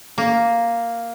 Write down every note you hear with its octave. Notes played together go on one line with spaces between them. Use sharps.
A#3